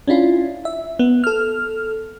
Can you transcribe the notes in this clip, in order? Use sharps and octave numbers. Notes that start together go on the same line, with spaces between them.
C#4 D4 E4 F4
E5
B3
A4 F6